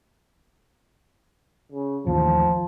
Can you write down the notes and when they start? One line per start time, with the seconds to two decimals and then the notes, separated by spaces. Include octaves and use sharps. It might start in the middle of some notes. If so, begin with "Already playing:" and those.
1.72 C#3
2.06 A1 D#2 A2 F3